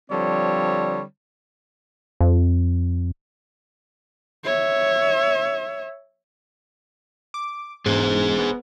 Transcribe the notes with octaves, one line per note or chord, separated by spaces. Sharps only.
D3 F3 G3 C4 C#5
F2
C#5 E5
D6
E1 G#2 G#4 C5
B3